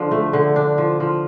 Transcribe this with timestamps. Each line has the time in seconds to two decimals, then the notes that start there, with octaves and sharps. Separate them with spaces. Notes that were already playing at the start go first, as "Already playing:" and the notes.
Already playing: D3 F3 D4
0.11 A3
0.33 D3
0.56 D4
0.78 F3
1.00 F3